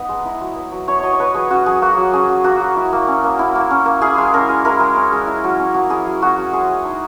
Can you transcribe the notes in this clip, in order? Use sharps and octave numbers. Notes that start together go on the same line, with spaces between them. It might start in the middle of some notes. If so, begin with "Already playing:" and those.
Already playing: B3 D#4 D#5
G#3
E4
F#3
B3
F#3
E4 C#5
F#3 C#5 D#5
C#5
B3 B4
F#3 G#4
C#4 F#4
F#3 G#4
A#3 F#4
F#3
C#4 G#4
F#3
A#3 F#4
F#3
E4
A#3
C#4
A#3
E4
A#3
C#4
A#3
E4 G#4
G#3
C#4 A#4
G#3
E4 A#4
G#3
C#4
G#3
E4
F#3
C#4
F#3
E4 G#4
F#3
C#4 F#4
F#3
G#3 G#4
G#3
D#4